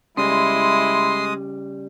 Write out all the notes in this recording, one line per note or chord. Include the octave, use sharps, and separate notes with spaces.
C#3 G3 G#3 E4 C6 D#6